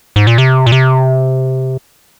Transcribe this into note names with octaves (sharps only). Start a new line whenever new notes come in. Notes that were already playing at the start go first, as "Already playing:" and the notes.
G#2
A#2
C3
A#2
C3